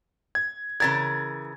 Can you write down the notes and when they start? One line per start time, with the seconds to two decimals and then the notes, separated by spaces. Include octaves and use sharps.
0.35 G#6
0.80 C#3 E3 A#4 G#6 A6